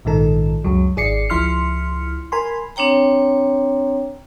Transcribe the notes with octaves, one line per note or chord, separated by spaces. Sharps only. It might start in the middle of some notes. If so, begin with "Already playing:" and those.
A#1 G#2 D#3 A4
C#2 F#2 F#3
G#1 G#4 D5 C7 C#7
C#2 F3 E4 C6 F6 C#7
A#4 G#5 B5 C6
C4 D4 C#5 G5 A#5